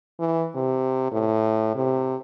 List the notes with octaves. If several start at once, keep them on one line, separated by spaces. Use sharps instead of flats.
E3
C3
A2
C3